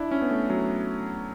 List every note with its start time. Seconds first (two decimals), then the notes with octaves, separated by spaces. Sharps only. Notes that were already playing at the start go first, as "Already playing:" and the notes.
Already playing: D4 E4
0.11 C#4
0.22 B3
0.31 A3
0.50 F#3